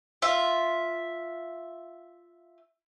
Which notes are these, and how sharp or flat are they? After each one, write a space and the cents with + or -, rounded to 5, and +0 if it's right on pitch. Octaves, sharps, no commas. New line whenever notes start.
F4 +0 E5 +0